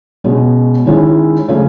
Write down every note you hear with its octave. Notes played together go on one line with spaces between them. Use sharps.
B2 G#3 C#4
D#3 G#3 C#4 E4
C#3 F3 A3 C#4